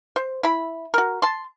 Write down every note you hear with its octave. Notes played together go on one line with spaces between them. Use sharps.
C5
E4 B5
F#4 A#4
A5 C6